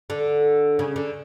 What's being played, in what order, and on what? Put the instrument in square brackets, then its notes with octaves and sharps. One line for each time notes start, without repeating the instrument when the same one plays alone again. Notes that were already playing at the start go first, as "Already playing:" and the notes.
[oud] D3
C#3
D3